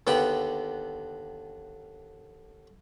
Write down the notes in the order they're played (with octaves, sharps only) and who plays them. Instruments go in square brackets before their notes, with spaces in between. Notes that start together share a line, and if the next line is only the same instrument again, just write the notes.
[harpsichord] D#2 D3 B3 F#5 G5